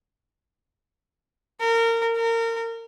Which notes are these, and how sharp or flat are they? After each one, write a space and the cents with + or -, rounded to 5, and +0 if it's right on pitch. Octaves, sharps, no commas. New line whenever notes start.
A#4 -25
A#4 -30